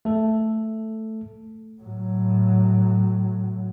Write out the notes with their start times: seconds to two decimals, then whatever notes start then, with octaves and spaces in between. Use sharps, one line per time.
0.05 A3 A4
1.81 A2 F#3